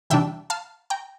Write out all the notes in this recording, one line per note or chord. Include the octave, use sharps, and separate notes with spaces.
E2 C3 G3 D4 E5 G5
F5 A5
G5 A#5